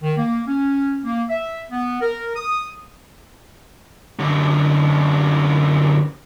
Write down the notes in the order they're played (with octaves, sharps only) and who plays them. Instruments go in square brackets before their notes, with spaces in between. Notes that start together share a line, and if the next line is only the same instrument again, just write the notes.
[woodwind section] D#3
A#3
C#4
A#3
E5
B3
A#4
D#6
[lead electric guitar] F#2 D3